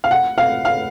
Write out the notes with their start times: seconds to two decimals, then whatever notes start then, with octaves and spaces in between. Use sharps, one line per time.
0.04 F5
0.11 F#5
0.38 F5
0.65 F5